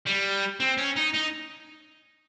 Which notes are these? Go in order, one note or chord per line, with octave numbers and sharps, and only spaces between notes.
G3
C4
C#4
D#4
D#4